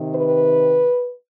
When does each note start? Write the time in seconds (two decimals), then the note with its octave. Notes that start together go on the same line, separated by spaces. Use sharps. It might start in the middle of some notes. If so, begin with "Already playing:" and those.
Already playing: C3 D#3
0.16 B4